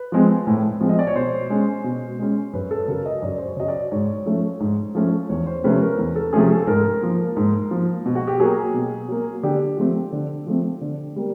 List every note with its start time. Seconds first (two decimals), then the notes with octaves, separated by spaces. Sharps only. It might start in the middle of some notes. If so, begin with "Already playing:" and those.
Already playing: B4
0.12 F3 G#3 C4
0.47 A2
0.81 F3 G#3 C4
0.89 D#5
0.99 D5
1.07 C#5
1.15 B2 C5
1.50 G#3 C#4
1.84 B2
2.19 G#3 C#4
2.54 F#2 B4
2.71 A4
2.88 C#3 F#3 A#4
3.05 D#5
3.22 F#2 D5
3.38 C5
3.46 C#5
3.57 C#3 F#3 D#5
3.68 D5
3.91 G#2 C#5
4.26 F3 A3 C#4
4.60 G#2
4.95 F3 A3 C#4
5.29 E2 C#5
5.46 C5
5.64 C3 F3 A3 C#4 B4
5.81 A#4
5.98 E2
6.16 A4
6.33 C3 F3 A3 C#4 G#4
6.50 A4
6.62 A4
6.67 G#2 A#4
7.02 F3 A#3
7.37 G#2
7.71 F3 A#3
8.06 B2
8.15 F#4
8.27 G4
8.40 F#3 A#3 G#4
8.74 B2
9.08 F#3 A#3
9.43 D3 G4
9.77 F3 A3 C4
10.12 D3
10.46 F3 A3 C4
10.81 D3
11.16 G3 A#3